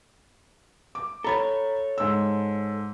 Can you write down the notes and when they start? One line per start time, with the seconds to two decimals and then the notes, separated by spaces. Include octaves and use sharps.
0.95 D6
1.24 A4 C#5 A#5 B5 A6
1.98 G#2 E6